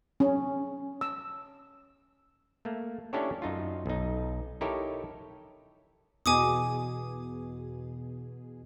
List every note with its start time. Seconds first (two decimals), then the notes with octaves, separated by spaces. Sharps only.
0.20 C#4
1.01 E6
2.65 A3 A#3
3.13 C#4 D4 E4 G4 A4 C#5
3.42 F#2 D#4 F4
3.86 B1 D#4
4.61 D#4 E4 G4 A4 A#4 C#5
6.26 E2 B2 G#4 G#5 D6 D#6